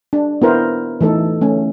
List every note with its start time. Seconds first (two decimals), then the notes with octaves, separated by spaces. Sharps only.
0.13 D4
0.42 B3 E4 A#4 C5
1.01 E3 A3 D#4 A4
1.41 A3 C#4